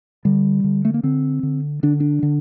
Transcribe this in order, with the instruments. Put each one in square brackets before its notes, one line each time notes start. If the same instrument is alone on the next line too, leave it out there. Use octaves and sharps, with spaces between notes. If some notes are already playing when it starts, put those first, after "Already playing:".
[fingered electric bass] D3 G3
D3
A3
A#3
D3 C4
D3
D3 D4
D4
D3